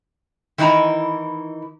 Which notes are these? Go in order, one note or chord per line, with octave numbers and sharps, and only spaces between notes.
D#3 E3 D#4 E4 A#5